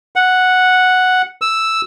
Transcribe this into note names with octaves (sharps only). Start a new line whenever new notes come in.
F#5
E6